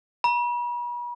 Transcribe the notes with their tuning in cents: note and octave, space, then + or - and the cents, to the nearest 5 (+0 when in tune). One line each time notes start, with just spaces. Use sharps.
B5 -40